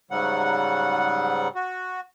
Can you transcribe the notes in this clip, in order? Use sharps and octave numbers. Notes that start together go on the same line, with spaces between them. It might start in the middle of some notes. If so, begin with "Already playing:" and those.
G#2 C#3 F#3 G3 F#5
F#4